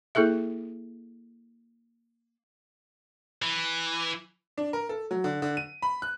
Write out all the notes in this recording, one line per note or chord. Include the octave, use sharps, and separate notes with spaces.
A#3 E4 G#4 A4 E5
E3
D4
A#4
A4
F#3
D3
D3
D#7
B5
F#6